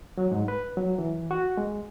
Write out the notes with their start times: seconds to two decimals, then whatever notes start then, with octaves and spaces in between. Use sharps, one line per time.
0.18 F#3
0.32 G#2
0.48 B4
0.77 F#3
0.98 E3
1.31 F#4
1.57 G#3